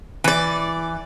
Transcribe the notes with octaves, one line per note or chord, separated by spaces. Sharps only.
E3 D5